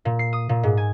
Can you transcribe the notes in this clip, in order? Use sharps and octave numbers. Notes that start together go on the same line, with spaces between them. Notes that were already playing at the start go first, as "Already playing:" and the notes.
A#2
C7
D#6
A#2
G#2
G#5